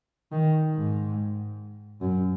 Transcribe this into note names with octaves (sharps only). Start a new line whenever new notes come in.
D#3
G#2
F#2